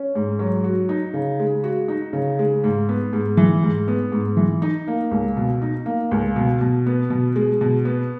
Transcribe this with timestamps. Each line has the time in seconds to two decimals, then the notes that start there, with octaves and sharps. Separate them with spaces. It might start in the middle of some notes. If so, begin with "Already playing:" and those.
Already playing: C#4
0.15 G#2
0.39 F#3
0.64 F#4
0.89 D#4
1.14 C#3
1.40 G#3
1.64 F#4
1.88 D#4
2.13 C#3
2.39 G#3
2.64 G#2
2.89 B3
3.13 G#2
3.37 E3
3.63 G#2
3.88 B3
4.12 G#2
4.37 E3
4.62 D#4
4.88 A#3
5.11 C#2
5.37 B2
5.62 D#4
5.86 A#3
6.11 C#2
6.36 B2
6.61 B2
6.86 B3
7.10 B2
7.36 G#3
7.61 B2
7.85 B3